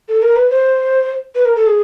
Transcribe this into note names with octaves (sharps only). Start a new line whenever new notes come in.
A4
A#4
B4
C5
B4
A#4
A4
G#4